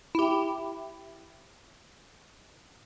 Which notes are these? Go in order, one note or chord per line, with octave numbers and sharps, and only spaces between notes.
E4 G4